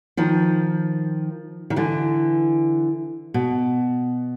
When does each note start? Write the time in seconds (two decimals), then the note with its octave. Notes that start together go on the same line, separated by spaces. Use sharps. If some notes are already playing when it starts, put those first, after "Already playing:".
0.17 D#3 F3
1.70 D#3
1.76 D3 E3
3.34 B2